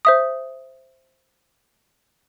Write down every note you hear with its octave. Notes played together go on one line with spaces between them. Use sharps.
C5 E5 D#6